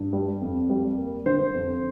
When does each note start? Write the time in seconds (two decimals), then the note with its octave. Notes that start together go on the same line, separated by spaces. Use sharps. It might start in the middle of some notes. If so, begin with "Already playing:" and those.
Already playing: G2
0.13 G3
0.41 F2
0.70 G3
0.98 A#3
1.26 D3 C5
1.54 F2